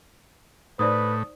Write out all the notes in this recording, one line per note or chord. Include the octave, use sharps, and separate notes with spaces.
A2 D#4 B4 C5 D5 D#6